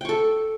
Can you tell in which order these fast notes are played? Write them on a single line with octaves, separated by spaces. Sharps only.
G5 C#6 A4